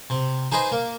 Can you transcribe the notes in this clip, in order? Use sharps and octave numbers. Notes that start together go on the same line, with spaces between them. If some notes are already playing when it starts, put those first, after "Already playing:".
C3
D#4 G#4 B4 C5 D#5
A#3